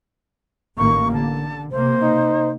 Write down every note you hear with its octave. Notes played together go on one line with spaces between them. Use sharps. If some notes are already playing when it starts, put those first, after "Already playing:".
A1 D#3 A#3 C#6
D3 A5
C3 A#3 C5
D#4